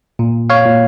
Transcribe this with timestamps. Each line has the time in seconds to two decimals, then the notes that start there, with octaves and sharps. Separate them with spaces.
0.19 A#2
0.50 C#5 F5
0.66 A#2